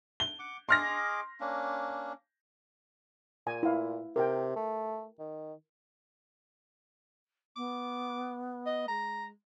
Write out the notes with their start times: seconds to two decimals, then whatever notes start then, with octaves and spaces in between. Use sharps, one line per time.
0.20 G7
0.39 F#5 D6
0.69 G#4 D#5 C6 D6 F6 A#6
1.40 A#3 C#4 D4
3.47 A#2 G#5
3.63 E4 F5
4.16 C3 A#4 G5
4.56 A3
5.20 D#3
7.56 B3 D6
8.66 D#5
8.88 G#3 A#5